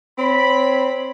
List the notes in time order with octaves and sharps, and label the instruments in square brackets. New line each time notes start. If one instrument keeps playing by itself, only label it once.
[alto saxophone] C4 [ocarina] C#5 [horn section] B5